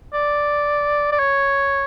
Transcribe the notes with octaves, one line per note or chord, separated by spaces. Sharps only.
D5
D5
C#5